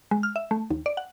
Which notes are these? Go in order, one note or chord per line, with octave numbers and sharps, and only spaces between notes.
G#3
F6
E5
A3
D#2
D5
F#5